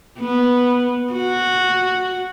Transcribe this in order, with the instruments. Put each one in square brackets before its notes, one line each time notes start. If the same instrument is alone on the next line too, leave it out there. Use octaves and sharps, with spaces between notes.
[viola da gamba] B3
F#4